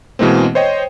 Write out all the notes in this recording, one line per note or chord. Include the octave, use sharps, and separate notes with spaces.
B2 E3 G#3 A#3 C4
C5 C#5 D#5 G5